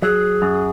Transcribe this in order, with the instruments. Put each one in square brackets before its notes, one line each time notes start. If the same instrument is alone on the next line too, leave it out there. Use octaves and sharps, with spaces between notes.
[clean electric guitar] F#3 [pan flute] G#4
[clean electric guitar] F#2